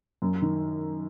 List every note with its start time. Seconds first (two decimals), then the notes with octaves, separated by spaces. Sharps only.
0.22 F#2
0.42 D#3